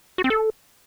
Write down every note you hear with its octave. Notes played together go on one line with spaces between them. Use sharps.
F#4
C4
A4